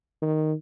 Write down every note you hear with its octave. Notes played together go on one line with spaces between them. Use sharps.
D#3